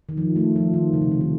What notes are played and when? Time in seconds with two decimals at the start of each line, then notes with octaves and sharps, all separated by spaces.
0.09 D#3
0.17 F3
0.36 A3
0.56 F3
0.73 D#3
0.93 C#3
1.01 C3
1.11 C#3
1.21 D#3